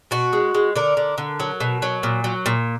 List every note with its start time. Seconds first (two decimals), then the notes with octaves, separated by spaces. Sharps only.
0.11 B2 F#4
0.33 G#3
0.55 G#3
0.76 D3 A#4
0.97 D3
1.18 D3
1.40 F#3
1.60 B2
1.82 F#3
2.03 A#2
2.24 F#3
2.46 A#2